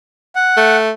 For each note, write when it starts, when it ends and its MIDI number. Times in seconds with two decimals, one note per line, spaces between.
0.35 0.77 78
0.57 0.91 57